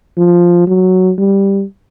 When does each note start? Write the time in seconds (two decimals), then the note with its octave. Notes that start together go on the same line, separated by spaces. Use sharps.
0.17 F3
0.67 F#3
1.18 G3